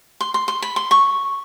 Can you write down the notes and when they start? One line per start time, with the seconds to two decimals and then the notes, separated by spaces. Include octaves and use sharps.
0.21 C6
0.34 C6
0.48 C6
0.62 B5
0.76 C6
0.91 C#6